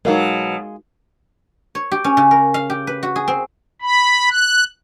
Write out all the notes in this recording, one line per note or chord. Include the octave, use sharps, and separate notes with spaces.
B2 F#3 G#3 D#4 F#4 A#4 F5
C#5
G4
C#4
C#3
A#4
F5
G4
B4
F#4
G#4
C4
B5
F#6